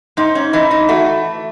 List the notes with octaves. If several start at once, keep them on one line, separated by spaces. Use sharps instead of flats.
G#2 D#4
C#4
E3 D#4
D#4
A3 F#4